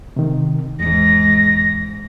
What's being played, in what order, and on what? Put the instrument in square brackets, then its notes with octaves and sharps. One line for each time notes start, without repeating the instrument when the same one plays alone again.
[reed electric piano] C3 D#3
[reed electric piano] E2 [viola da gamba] G#2 [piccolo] A#6